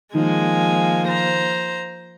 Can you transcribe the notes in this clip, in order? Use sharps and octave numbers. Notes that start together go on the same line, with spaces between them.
D#3 F3 G#3 A#3 D#4 G#5
C5 A#5